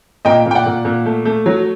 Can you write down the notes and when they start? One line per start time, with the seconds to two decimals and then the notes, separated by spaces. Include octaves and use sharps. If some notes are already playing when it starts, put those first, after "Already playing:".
0.25 A#2 D#5 G5
0.46 A#2
0.51 G5
0.55 D5 F#5
0.66 A#2
0.85 A#2
1.05 A3
1.25 A3
1.46 F#3